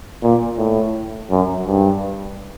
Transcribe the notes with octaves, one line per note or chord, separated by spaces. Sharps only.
A#2
A2
F#2
G2